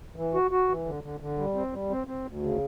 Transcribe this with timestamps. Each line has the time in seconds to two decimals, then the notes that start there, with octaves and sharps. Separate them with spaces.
0.16 E3
0.34 F#4
0.51 F#4
0.69 E3
0.85 D3
1.03 D3
1.20 D3
1.38 G3
1.55 C4
1.73 G3
1.90 C4
2.07 C4
2.26 D2
2.42 C#3